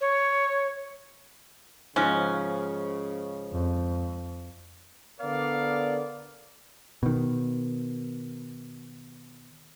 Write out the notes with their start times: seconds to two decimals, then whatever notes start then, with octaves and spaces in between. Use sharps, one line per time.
0.01 C#5
1.96 G#2 C#3 F3 C#4
3.53 F2
5.21 D3 B3 A#4 D5 F5
7.03 B2 D#3